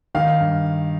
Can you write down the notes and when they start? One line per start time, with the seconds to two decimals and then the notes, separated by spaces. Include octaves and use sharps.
0.15 D#3 F5
0.40 G2